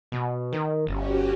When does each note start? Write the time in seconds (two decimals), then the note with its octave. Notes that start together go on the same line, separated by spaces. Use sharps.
0.12 B2
0.53 D#3
0.87 G1 C#4 F#4 G4